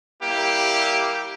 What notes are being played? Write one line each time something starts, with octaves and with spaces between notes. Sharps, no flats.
G3 A#3 E4 G4